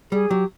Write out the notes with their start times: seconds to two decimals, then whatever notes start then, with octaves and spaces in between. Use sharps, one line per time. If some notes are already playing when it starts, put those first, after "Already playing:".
0.12 G3 G#4
0.30 F#3 G4